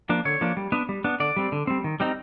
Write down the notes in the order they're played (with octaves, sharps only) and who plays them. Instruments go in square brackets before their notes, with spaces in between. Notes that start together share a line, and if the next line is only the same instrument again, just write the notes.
[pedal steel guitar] F3 A#3 D4
D3 C#5
F3 A#3 D4
G3
B3 D4
G3
B3 D4
D3 D5
G3 C4
D3
G3 C4
D#3
G3 C4 D#4